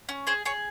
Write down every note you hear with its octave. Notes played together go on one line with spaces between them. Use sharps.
C#4
G#4 C5
G#4 C#5